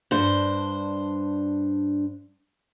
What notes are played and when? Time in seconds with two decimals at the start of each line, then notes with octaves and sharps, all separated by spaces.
0.11 G2 D4 C5